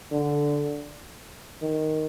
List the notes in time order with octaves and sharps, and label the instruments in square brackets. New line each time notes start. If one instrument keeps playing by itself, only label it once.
[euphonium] D3
D#3